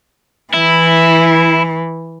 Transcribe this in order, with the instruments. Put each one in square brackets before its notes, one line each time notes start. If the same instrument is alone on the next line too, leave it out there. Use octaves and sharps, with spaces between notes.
[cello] E3 [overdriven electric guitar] E4